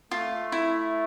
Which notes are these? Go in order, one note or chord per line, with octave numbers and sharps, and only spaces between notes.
A3 F4
E4